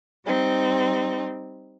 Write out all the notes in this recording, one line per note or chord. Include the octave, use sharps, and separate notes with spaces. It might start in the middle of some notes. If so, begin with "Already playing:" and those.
G3 C4 D#4